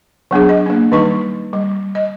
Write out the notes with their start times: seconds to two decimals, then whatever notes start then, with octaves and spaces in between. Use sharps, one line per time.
0.31 F#3 B3 D4 G#4
0.49 D#5
0.66 A#3 D4
0.92 D#3 G3 D#4 C#6
1.53 G3
1.95 D#5